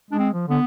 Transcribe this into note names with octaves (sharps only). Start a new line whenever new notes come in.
G#3 D4
C4
F3
D3 B3